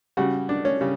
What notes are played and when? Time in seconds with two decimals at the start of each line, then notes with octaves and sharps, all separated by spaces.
0.17 C#3 G3 F#4
0.49 D4
0.65 C#4
0.81 C#3 G3